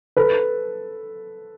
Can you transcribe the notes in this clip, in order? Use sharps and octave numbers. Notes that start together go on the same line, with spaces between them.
A4 B4